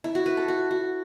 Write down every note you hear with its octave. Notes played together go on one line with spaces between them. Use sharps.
E4
F#4
B4
A4
F#4
F#4